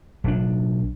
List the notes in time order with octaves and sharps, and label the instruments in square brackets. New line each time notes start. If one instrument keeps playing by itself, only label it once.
[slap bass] B1 C#4 D4